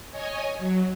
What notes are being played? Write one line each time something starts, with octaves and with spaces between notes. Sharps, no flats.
C#5 D#5 G#5
F#3